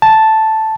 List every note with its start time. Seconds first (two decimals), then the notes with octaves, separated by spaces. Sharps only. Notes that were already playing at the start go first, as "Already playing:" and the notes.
0.02 A5